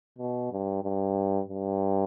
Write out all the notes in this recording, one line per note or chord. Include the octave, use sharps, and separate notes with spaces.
B2
G2
G2
G2